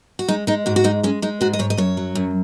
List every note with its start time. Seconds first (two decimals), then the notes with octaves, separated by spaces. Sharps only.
0.19 F#4
0.28 G#3 D#4
0.47 G#3 D#4
0.66 G#2 F#4
0.76 F#4
0.84 G#3 D#4
1.03 G#3 C#4
1.22 G#3 D#4
1.41 G#2 F#4
1.53 D#5
1.59 G#2 C#5
1.70 D#5
1.77 F#2 C#5
1.97 F#3
2.15 F#2